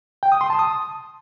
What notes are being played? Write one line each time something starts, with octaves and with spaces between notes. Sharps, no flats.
G5
D#6
C6
A5
D#6